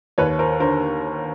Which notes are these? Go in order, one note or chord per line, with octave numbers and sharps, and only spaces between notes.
D#2 B4 C#5
A#4 C5
D3 A#4 C5